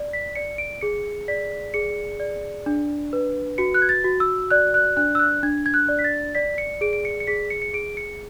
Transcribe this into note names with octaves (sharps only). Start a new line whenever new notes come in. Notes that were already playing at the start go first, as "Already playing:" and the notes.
Already playing: D5
B6
D5 C#7
D7
G#4 C#7
D5 B6
G#4 C#7
D5
D4
B4
F#4 C#7
F#6
G#6
A6
F#4
E6
D5 F#6
F#6
D4 F#6
E6
F#6
D4 G#6
G#6
F#6
D5
B6
A6
D5 B6
C#7
G#4 D7
D7
C#7
C#7
G#4 B6
C#7
C#7
G#4 D7
C#7